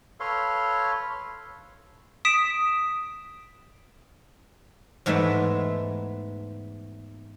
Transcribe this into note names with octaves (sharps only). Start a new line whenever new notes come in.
A4 B4 C#5 F5 C6
D#6 B6 D7 E7
E2 G#2 G#3 A3 B3 E5